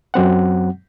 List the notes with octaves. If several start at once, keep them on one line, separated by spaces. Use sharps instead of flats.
F#2 F#3 C4 F#5